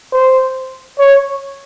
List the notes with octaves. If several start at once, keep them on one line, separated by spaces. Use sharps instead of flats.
C5
C#5